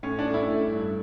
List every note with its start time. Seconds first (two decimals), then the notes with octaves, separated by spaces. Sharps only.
0.03 A2 C#4
0.19 D4
0.27 A2
0.34 E4
0.49 A3
0.73 G2